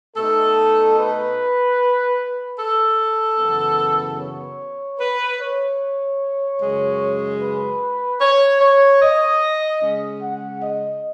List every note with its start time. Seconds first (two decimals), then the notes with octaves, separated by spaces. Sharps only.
0.17 B2 A3 D#4 A4
0.98 B4
2.58 A4
3.38 F#2 C#3 E3 B3
4.19 C#5
4.99 B4
5.39 C#5
6.60 F#2 C#3 G#3
7.40 B4
8.21 C#5
8.60 C#5
9.02 D#5
9.81 C#3 G#3 C#4
10.21 F#5
10.61 D#5